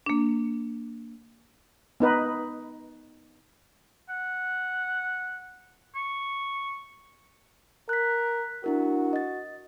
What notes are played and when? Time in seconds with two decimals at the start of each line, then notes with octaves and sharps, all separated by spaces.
0.06 A#3 D4
2.00 B3 D#4 B4
4.09 F#5
5.95 C#6
7.89 A#4 F#6 B6
8.64 D4 E4 F#4 A#4
9.13 D#5 A6